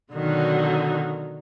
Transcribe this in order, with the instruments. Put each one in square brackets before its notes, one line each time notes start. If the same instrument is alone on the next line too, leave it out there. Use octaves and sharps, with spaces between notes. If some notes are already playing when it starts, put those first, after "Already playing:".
[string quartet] B2 D3 D#3 F#3